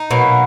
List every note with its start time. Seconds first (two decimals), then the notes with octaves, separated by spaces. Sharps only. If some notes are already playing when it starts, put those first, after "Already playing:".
Already playing: D#4
0.11 B2 F#3 A#3